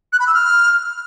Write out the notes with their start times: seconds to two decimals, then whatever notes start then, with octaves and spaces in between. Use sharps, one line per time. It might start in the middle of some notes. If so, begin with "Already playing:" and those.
0.13 F#6
0.20 B5
0.27 E6
0.34 F6